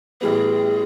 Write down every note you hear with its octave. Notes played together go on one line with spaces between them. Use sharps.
A1 A2 E3 G3 B3 G#4